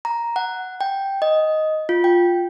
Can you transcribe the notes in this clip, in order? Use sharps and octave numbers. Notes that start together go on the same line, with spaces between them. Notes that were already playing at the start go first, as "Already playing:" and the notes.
A#5
F#5
G5
D#5
F4
G5